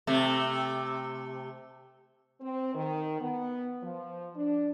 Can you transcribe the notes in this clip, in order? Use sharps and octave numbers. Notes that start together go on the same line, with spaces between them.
C3 A3
C4
D#3
B3
F3
D4